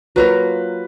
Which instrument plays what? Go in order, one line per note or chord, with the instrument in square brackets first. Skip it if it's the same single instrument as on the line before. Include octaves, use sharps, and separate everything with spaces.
[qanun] F#3 A#3 F4 A#4 [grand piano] B4